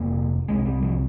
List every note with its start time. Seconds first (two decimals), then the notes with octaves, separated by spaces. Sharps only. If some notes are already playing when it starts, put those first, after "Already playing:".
Already playing: F1 C3 A#3
0.48 C2 C3 G#3
0.66 G3
0.82 F3